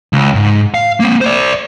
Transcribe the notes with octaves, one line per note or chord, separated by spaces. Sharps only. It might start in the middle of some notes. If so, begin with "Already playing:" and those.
C#2
G#2
F5
A#3 C4
C5 D5